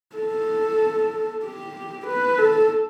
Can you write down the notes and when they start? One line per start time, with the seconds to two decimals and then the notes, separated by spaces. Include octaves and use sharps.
0.16 A4
1.44 G4
2.07 B4
2.38 A4